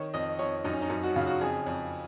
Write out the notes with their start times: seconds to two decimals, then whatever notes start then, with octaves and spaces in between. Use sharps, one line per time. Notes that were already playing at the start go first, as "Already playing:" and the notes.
Already playing: D#3 C#5
0.14 F2 D#5
0.39 F2 C#5
0.64 F#2 D#4
0.73 C#4
0.82 D#4
0.90 F#2
1.03 F#4
1.16 C#3 F4
1.27 F#4
1.41 F2 G#4
1.67 F2